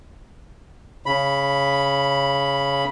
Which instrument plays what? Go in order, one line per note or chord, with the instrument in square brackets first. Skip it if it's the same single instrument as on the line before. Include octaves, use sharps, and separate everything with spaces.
[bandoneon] C#3 B5